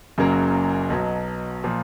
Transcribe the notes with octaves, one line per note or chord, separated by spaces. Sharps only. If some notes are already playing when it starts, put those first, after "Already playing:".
F#1 F#2 C#3 F#3 A#3
B1 B2 F#3
A#2 F3